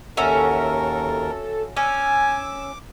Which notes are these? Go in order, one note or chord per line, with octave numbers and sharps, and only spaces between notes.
D#2 C#4 F#4 A4 A#4 E5
C#4 G#5 D6 E6